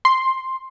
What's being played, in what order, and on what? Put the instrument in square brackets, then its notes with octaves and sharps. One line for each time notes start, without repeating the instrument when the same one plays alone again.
[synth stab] C6